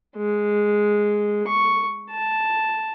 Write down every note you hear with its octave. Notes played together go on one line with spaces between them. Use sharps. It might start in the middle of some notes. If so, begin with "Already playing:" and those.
G#3
C#6
A5